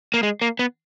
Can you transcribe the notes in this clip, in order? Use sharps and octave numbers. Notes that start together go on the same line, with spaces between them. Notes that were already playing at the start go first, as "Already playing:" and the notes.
A#3
G#3
A#3
B3